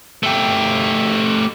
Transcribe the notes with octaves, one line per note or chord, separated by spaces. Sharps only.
A3 G4